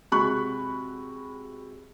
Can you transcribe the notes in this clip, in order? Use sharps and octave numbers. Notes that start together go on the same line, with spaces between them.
C3 G#3 F#4 B5 C#6 F#6